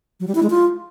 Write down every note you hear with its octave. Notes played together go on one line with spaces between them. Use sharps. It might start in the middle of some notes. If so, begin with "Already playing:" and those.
F#3
G3
E4
G#3
F4